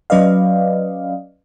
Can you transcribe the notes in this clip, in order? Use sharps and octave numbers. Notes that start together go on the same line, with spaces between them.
F#3 C#4 B4 D5 D#5 F5